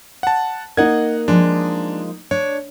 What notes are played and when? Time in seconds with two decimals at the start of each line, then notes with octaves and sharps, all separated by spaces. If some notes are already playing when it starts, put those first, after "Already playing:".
0.23 F#5 A5
0.77 A#3 D#4 D#5 F#5 G#6
1.28 F3 G#3 D4
2.31 D4 C#5